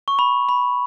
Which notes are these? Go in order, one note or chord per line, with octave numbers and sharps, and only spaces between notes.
C#6
B5
B5